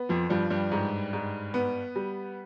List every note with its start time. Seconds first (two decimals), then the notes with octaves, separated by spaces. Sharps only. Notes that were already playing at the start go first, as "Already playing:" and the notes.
Already playing: B3
0.09 F2 F3
0.29 G2 F3 G3
0.50 G2 G3
0.72 G#2
1.13 G#2
1.54 B3
1.96 G3